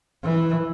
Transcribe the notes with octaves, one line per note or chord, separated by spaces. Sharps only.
E3